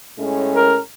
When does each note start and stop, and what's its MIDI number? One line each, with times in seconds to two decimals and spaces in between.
0.18 0.78 45
0.18 0.78 56
0.18 0.78 61
0.56 0.79 70